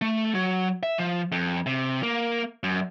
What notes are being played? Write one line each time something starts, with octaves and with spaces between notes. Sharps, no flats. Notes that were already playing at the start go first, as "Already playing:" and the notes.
A3
F#3
E5
F3
F2
C3
A#3
F#2